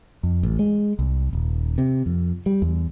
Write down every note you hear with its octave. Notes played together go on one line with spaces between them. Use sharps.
F2
A1
G#3
C2
D#1
C3
F2
G3
E2